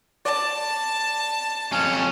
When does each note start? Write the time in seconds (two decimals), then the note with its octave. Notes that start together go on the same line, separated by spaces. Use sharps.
0.25 D5 A5
1.72 F2 C#4